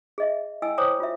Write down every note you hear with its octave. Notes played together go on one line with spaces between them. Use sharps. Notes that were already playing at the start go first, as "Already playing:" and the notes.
G#4 D#5 E5
E4 D#5 G5 G#5 E6
C5 C#5 G5 A#5 D6 D#6
F4 F#4 E5